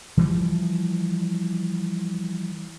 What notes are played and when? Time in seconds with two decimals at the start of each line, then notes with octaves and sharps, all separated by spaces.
0.17 E3 F3 G3